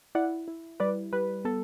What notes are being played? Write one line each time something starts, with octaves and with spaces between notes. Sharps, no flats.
E4 D5 F#5
E4
G3 B4 D5
G3 B4
B3 A4